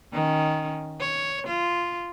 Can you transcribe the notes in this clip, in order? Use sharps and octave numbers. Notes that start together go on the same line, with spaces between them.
D#3 C#4
C#5
F4